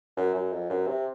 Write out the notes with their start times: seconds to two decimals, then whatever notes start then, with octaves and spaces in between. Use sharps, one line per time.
0.17 F#2
0.34 F#2
0.53 F2
0.70 F#2
0.87 C3